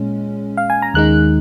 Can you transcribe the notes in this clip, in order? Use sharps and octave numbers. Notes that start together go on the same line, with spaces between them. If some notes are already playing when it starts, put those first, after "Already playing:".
Already playing: A#2 G#3 C#4
F5
G#5
A#5
D#2 D#3 G#3 D#4 F#6